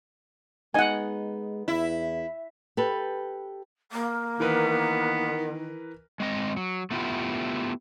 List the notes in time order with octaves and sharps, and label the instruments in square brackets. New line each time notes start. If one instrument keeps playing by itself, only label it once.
[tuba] G#3 [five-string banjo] B3 D#4 [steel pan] F#5 G#5
[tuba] E2 [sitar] E4
[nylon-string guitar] G4 A4 B4
[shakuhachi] A#3
[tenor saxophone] D#3 [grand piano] E3 A#4 B4 [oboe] B3
[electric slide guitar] G#3 C4 D#5
F#3
A3 B3 E4 F4 G4